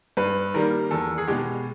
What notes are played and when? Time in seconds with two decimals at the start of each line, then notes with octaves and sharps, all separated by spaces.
0.17 G2 B4
0.54 D#3 G3 A#3 A#4
0.91 E2 A4
1.18 G#4
1.28 B2 G#3 G4